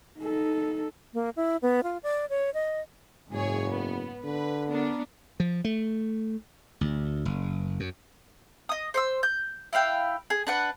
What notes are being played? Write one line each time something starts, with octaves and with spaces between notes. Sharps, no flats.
D#4 A4
A#3
E4
B3
F4
D5
C#5
D#5
F#1 G#2 G#4 C#5
B3
D3 B4
B3 D4 A#4
F3
A3
D2
F#1
F#2
D#5 D#6
C5 C6 E6
G6
E4 B4 F5 G5
G#4
D4 B4 F#5